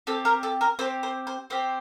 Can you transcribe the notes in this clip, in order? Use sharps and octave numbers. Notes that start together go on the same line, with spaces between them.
C4 G4 A4
A#4
A4
A#4
C4 G4 C5
C5
C5
C4 G4 C5